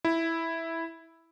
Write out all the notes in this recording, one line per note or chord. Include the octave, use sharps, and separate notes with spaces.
E4